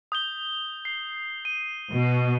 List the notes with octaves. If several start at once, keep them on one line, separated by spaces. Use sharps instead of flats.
D#6 G6 G7
C7
D#7
B2